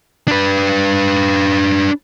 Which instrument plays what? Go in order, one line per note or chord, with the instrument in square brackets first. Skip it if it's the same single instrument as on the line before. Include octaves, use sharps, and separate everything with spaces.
[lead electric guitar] D4 B4